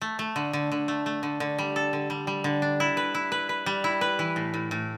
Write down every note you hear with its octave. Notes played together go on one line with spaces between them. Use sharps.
A3
A3
D3
D3
D3
A3
A3
D3
D3
G3
A4
D3
G3
G3
D3
D4
E4
B4
E4
B4
B4
G3
E4
B4
E3
A2
A2
A2